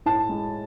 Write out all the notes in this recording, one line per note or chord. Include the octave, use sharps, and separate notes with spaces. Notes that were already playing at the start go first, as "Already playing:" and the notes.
A2 A5
G#3